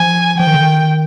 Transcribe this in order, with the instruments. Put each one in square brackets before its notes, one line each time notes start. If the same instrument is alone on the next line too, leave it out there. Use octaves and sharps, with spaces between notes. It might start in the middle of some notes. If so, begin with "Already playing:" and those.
Already playing: [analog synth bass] F3 [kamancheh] G#5
[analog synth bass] F3 [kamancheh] G5
[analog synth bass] D#3
D3
D#3